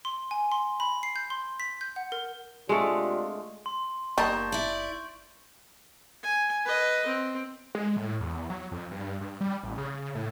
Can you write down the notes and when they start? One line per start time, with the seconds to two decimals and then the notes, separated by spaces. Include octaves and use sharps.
0.05 C6
0.31 G#5
0.52 C6
0.80 B5
1.03 C7
1.16 G6
1.30 C6
1.60 B6
1.81 G6
1.96 F#5
2.12 A#4
2.69 C3 G#3 A3 D4 F4
3.66 C6
4.18 F#1 G3 A#3 D#4 A5 C#6 G6 A6
4.52 E4 D5
6.23 G#5
6.65 B4 D#5
7.07 C4
7.75 G#3
7.96 A2
8.20 E2
8.50 F#3
8.72 F2
8.91 G2
9.21 G2
9.41 G3
9.63 A1
9.78 C#3
10.15 A2